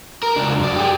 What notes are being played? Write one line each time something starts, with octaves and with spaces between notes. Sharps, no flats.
A#4
C#2 D4
F#2 D5
G4 G#4